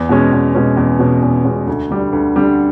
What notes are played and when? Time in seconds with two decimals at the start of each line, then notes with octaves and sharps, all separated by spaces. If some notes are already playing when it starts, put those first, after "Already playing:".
Already playing: E2
0.09 B2 G#3 C#4
0.32 E2
0.55 B2 G#3 C#4
0.77 E2
0.99 B2 G#3 C#4
1.22 E2
1.45 B2 G#3 C#4
1.67 D2
1.91 D3 G3
2.13 D2
2.36 D3 G3